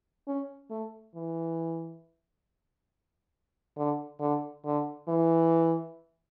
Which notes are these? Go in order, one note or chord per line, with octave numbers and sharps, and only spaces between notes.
C#4
A3
E3
D3
D3
D3
E3